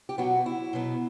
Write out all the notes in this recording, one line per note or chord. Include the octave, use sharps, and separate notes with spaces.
G4
B2 F#3 B3 F#4
E4
B2 F#3 B3